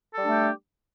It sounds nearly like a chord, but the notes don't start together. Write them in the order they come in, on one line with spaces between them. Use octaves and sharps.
A4 G3 D4 A3 G4